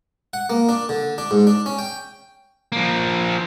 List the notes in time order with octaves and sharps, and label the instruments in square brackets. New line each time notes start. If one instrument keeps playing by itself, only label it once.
[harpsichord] F#5
A#3
D4
D3
D4
G#2
D4
C#4
G5
[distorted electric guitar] F3 A#3